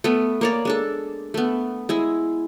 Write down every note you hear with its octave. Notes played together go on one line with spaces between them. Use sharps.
A3 B3
A#3 C#5 D5
G#3 D4 A4
A3 B3
G#3 E4 G#4